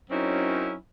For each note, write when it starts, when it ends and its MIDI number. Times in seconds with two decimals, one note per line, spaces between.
0.10 0.75 42
0.10 0.75 54
0.10 0.75 60
0.10 0.75 61
0.10 0.75 63
0.10 0.75 64